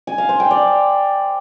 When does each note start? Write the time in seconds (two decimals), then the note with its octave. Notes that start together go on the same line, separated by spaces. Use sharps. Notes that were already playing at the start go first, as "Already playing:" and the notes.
0.07 G#5
0.18 F5
0.29 C5
0.40 G5
0.51 D5